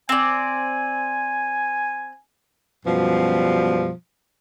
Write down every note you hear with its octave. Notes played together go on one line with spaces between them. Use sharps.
C4 D5 G#5
F#2 B2 F3 G3